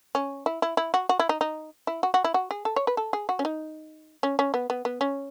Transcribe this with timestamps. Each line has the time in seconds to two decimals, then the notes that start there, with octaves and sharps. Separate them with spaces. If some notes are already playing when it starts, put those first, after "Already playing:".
0.15 C#4
0.46 E4
0.62 E4
0.77 E4
0.94 F#4
1.09 F#4
1.19 E4
1.29 D#4
1.41 D#4
1.87 E4
2.03 F#4
2.14 F#4
2.24 E4
2.34 F#4
2.51 G#4
2.65 A4
2.76 C#5
2.87 B4
2.97 A4
3.13 G#4
3.29 F#4
3.39 C#4
3.45 D#4
4.23 C#4
4.39 C#4
4.54 B3
4.70 B3
4.85 B3
5.01 C#4